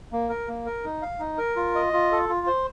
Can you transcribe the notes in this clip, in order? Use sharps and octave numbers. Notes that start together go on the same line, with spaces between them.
A#3
A#4
A#3
A#4
D#4
F5
D#4
A#4
F4
D#5
F4
A4
F4
C5